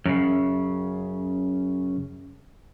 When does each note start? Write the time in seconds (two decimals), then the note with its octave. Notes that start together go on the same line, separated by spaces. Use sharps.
0.06 F#2 A2 C#3